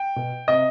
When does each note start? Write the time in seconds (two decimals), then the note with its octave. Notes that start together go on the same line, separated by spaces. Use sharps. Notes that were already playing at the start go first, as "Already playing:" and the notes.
Already playing: G5
0.16 B2
0.48 C3 D#5